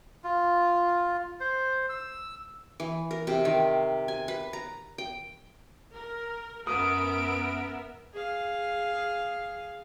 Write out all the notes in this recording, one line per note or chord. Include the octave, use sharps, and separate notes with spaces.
F4
C5
E6
E3
A#4
C3
D#3
G#5
B4
A#5
G5
A#4
F#2 B3 A#4 E5 D#6 D7
G#4 F5